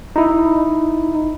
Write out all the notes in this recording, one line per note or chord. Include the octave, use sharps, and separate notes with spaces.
D#4 E4